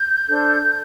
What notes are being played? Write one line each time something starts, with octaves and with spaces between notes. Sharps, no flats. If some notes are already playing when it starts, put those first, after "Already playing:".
Already playing: G6
D4 A4 C5